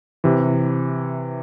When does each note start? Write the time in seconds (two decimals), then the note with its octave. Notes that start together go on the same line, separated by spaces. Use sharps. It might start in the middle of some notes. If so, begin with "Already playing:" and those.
0.24 C3 E3